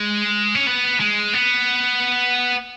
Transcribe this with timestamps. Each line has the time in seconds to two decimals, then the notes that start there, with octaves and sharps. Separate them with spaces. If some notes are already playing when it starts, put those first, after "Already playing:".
Already playing: G#3
0.55 C#4
0.67 B3
1.00 G#3
1.34 B3